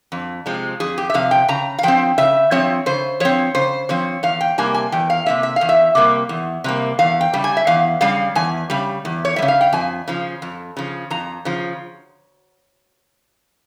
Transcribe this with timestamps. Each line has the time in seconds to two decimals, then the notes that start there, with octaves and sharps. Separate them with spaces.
0.12 F2
0.46 C3 F3 G#3 C4
0.80 F2 G#4
0.98 G4
1.10 E5
1.14 C3 F3 F5
1.31 G5
1.48 C#3 A#5
1.78 F5
1.83 F3 C4 G5
2.18 C#3 E5
2.51 F3 C4 C#5
2.86 C#3 C5
3.20 F3 C4 C#5
3.55 C#3 C5
3.89 F3 C4 C#5
4.23 E2 F5
4.41 G5
4.58 C3 G3 A#3 G#5
4.74 G#5
4.92 E2 G5
5.10 F5
5.26 C3 G3 A#3 E5
5.43 E5
5.56 E2 F5
5.69 E5
5.95 C3 G3 A#3
6.29 E2
6.64 C3 G3 A#3
6.99 E2 F5
7.21 G5
7.33 C#3 G3
7.44 G#5
7.57 E5
7.67 E2 F5
8.01 C#3 G3 F5
8.35 E2 G#5
8.70 C#3 G3
9.05 E2
9.25 C#5
9.36 G3 E5
9.42 C#3
9.48 F5
9.61 G5
9.73 F2 G#5
10.08 C#3 F3
10.42 F2
10.77 C#3 F3
11.10 F2 A#5
11.45 C#3 F3